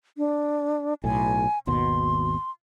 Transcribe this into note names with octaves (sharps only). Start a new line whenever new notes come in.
D4
B1 A2 G#5
G#1 D#2 B2 C6